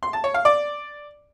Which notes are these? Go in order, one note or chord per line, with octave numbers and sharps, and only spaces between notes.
C6
A5
C#5
F5
D5